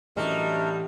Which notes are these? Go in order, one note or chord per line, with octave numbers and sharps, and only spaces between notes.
F#2 A2 E3 G3 A3 D4 A#4 D#5